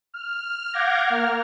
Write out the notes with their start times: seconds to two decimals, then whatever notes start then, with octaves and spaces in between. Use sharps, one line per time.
0.14 F6
0.73 F5 F#5 D6 G6 G#6 A#6
1.06 A#3 F6